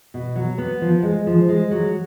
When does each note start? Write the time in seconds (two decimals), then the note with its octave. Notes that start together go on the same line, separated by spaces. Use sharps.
0.14 B2
0.36 F#3
0.58 B3
0.82 F3
1.03 G#3
1.27 F3
1.49 G#3
1.71 F#3